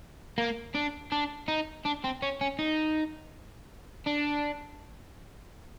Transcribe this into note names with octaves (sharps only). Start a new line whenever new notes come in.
A#3
D4
D4
D#4
D4
C4
C#4
C#4
D#4
D4